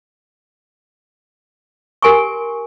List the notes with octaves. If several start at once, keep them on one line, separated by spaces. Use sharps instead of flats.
G4 A#4 G#5 C6 C#6